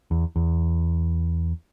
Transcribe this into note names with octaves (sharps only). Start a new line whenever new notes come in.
E2
E2